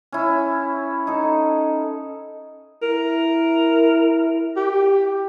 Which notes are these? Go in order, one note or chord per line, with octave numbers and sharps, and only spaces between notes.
C#4 E4
D#4 A4
E4 A#4
G4